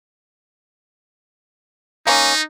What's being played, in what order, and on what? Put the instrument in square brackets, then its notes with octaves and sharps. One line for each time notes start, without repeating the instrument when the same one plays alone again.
[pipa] A#3 C#4 [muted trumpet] D#4